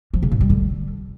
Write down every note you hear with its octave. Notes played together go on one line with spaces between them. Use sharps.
F3
C#3
G#2
G3
D3